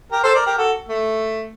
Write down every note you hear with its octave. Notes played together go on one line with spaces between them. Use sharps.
G4 A#4
A4 C5
A#4 D5
G4 A#4
F#4 A4
A3